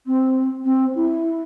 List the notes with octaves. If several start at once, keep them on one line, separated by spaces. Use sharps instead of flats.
C4
C4
E4